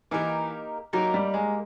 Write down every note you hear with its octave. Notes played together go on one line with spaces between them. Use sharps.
E3 A#3 D#4 G4 A#4
F#3 A#3 D#4 G4 A#4
G3
G#3